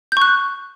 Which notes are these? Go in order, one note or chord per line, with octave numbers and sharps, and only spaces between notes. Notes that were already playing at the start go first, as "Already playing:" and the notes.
C#6 F#6 G6